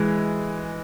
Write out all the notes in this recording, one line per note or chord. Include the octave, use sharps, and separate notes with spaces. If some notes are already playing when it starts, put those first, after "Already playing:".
Already playing: E3 G#3